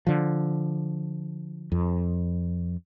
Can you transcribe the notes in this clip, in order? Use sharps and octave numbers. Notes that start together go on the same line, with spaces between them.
D3 F3
F2